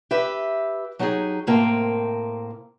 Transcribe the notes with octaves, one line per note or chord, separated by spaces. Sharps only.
G4 B4 E5
F#3 D#4 F4 G4 G#4
A2 C3 A#3 C4 A#4 G5